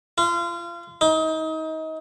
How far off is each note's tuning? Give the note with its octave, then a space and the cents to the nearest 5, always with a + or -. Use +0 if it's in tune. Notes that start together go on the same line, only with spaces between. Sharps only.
F4 -30
D#4 +30